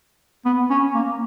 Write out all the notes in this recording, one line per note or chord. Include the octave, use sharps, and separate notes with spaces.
B3
C#4
A#3